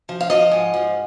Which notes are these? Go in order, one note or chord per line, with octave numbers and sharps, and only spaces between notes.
F3
F5
F3 D#5
G#2
F3